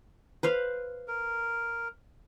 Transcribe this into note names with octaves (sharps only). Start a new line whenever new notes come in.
B4 C5 F5
A#4